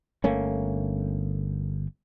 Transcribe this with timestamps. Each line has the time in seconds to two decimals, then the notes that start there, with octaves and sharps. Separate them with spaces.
0.24 G1 A3 A#3 C#4